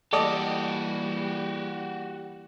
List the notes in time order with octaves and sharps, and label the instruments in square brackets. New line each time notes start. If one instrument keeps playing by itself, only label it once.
[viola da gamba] E3 G3 A#3 [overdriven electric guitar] F#4 G4 [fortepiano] A4 D5 D#5